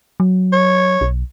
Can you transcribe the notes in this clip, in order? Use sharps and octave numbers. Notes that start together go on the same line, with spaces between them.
F#3
C#5
B1